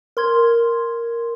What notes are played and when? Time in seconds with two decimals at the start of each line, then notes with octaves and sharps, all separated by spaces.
0.17 A#4 C6 G#6